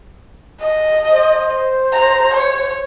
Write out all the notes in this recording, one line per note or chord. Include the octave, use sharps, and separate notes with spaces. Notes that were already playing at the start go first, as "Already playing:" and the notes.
D#5
C5
A#5
C#5